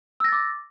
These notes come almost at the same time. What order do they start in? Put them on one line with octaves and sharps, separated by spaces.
E6 A#6 A6 D6